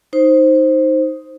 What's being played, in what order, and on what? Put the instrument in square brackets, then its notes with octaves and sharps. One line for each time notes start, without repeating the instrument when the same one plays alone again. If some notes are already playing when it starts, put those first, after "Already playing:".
[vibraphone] D#4 C5